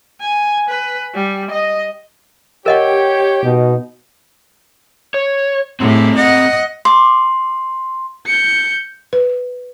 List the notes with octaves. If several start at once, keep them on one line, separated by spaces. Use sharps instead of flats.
G#5
B4
G3
D#5
G4 A#4 C#5 D#5 F#5
B2 D#4
C#5
A2 C4 G4 G#4
D#5 F#5
C6 D6
G6 C#7
B4